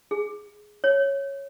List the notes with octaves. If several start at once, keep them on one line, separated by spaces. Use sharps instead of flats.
G#4
C#5